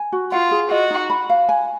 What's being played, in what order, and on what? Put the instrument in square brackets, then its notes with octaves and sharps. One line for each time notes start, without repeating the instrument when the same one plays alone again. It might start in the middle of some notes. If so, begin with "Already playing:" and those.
Already playing: [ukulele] G#5
F#4
[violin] F4 [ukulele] F#5
[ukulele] G#4
[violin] F#4 [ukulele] D#5
[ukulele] D#4
B5
F5
G#5